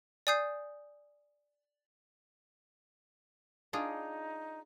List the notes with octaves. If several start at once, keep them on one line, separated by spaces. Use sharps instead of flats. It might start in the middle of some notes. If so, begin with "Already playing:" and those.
D5 G#5 D#6 G6 C7
D4 D#4 F4 G#4